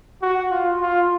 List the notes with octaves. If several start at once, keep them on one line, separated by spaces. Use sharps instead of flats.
F#4
F4
F4